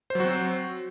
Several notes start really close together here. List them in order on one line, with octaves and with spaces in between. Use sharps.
C5 F#3 F#4 C4